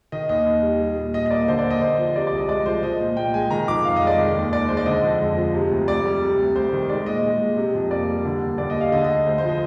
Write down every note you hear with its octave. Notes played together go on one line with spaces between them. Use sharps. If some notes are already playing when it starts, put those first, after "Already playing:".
D#3 D#5
D#2 D#5
D#2
G3
G3
A#2
A#2 D#5
D#5
A#3 D5
D3 C5
D5
D#2
D#5
D#2 C5
F3
C3 D5
D5
C2 D#5
G#3 D5
F3 C5
F3 D#5
A#2
A#2 G5
G#3 G#5
D#3 A#5
F2 D6
F2 F5
D#5
G#3 D5
D#3
D#2
D#2 D5
G#3 C5
D5
D3 D#5
F2
G#3
F3
C3
D2
D2 D5
G3
C3
D2
D2 C5
D#3
G#3 D5
A#2 D#5
G#3
A#2
C3
F2
A#3 D5
G3
D3
D#2
D#2 D5
D#5
G3
F5
D3 D#5
D#5
D2
D2 C5
C5
F3 D#5